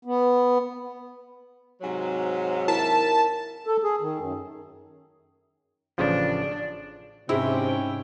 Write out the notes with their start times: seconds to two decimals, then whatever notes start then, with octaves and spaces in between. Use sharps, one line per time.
0.05 B3
1.81 G#2 C3 F#3
2.68 E4 A#4 A5 B6
3.67 A4
3.83 G#4
4.01 D#3
4.18 F#2
5.98 A1 C#3 F3 D4
7.29 G#2 C3 C#4 E4 G5